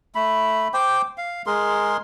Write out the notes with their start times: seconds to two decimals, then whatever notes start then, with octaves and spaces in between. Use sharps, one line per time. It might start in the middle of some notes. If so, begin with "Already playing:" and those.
0.15 A3 B5
0.74 C5 G5 D6
1.18 F5
1.46 G#3 G#4 A#4 C6